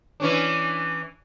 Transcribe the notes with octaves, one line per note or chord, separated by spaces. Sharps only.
E3 C#4 D4